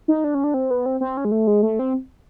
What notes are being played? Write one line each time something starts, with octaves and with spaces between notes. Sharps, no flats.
D#4
D4
C#4
D4
C4
B3
C4
C4
C#4
G#3
A3
G#3
A3
C4